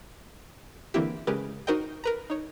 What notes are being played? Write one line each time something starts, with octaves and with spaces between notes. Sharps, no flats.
D3 E3 A#3 C4 E4 G4
C#3 G#3 G4 A#4 B4
D#4 F#4 A#4 C5 D#5 G5
A#4 B4 A#5
D#4 C#5